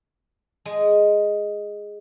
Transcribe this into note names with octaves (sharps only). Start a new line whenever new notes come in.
G#3